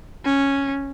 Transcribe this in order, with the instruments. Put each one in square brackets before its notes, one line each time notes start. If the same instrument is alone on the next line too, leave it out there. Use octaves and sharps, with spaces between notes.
[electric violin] C#4